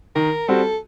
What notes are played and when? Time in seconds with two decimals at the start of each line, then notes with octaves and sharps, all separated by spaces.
0.15 D#3 A#4
0.48 G3 C4 F#4 A4